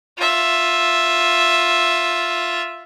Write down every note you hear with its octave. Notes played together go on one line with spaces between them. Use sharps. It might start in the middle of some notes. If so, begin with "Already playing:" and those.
F4 E5